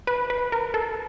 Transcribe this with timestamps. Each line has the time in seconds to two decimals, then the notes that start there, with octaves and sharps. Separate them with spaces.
0.07 B4
0.30 B4
0.52 A#4
0.74 A4